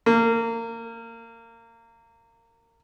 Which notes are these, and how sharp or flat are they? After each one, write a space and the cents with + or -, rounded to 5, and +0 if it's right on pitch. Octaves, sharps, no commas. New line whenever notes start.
A#3 -25